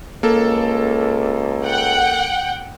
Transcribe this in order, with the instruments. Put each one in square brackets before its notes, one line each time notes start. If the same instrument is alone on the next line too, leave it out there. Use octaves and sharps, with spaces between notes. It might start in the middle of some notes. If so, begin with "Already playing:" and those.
[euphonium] C#2 [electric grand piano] A#3 A4
[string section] F#5 G5